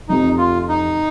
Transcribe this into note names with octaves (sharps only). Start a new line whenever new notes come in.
F1 F2 C3 D#4
F4
D#4